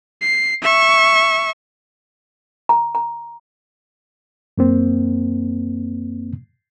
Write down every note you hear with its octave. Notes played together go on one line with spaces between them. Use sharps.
C7
E5 C#6
A#5
A#5
F#2 A#3 C4